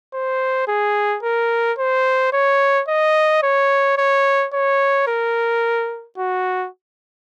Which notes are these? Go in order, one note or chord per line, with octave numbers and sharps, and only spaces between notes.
C5
G#4
A#4
C5
C#5
D#5
C#5
C#5
C#5
A#4
F#4